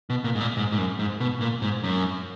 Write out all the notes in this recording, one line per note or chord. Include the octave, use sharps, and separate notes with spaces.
B2
A#2
G#2
A#2
G#2
G#2
F#2
G#2
B2
A#2
G#2
F#2